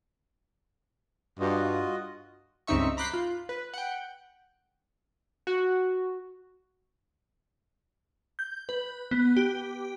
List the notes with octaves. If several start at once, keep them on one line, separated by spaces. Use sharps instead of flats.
G2 F4 F#4 D#5
C#2 G2 C4 D#4 E5 C#6
A#5 B5 D6 F#6 G6 C7
F4
B4
F#5 G5
F#4
G6
B4
B3
G4